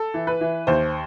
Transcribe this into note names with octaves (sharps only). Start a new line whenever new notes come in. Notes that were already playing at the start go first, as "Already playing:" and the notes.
Already playing: A4
E3
B4
E3
D#2 C5